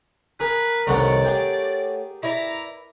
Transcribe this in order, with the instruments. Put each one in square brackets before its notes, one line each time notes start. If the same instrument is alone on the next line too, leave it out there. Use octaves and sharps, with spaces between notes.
[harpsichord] G#4 [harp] A#4 [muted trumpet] B4
[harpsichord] C2 G2 D#3 [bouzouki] A3 C#5 F#5 [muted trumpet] D5
[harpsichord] G4 G#4 G5
[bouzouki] E4 B4 D5 [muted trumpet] A#5